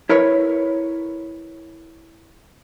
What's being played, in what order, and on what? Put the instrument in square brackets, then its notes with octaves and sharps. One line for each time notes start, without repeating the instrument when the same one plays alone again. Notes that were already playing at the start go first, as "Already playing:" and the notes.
[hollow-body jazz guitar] E4 A#4 B4 C#5